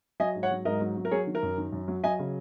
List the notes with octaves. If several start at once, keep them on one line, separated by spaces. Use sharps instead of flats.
F#3 D#5 G#5
G#2
C#5 F#5
F#3
G#2 A#4 D#5
F#3
F#3
A#4
F#3 G#4 C#5
D#3
A#4
F#2
D#3
F#2
F#3
F#3 D#5 G#5
C#3